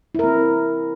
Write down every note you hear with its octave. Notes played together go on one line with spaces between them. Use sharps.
C4 E4 A#4